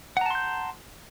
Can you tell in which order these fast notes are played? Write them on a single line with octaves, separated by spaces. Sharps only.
F#5 A#5 A5 C6 G6